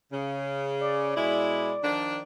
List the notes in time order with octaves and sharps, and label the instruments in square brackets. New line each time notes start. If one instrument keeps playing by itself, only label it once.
[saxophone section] C#3
[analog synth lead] D5
[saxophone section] B2 G#3 E4
D#3 F3 D4